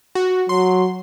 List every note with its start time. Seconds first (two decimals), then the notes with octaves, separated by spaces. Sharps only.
0.15 F#4
0.49 F#3 C6